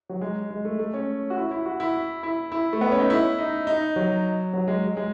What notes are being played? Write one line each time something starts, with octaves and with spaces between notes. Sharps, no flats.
F#3
G#3
G#3
A3
A3
C#4
F#4
E4
E4
F#4
E4
E4
E4
A3
B3
C#4
D#4
E4
D#4
D#4
F#3
F#3
G#3
G#3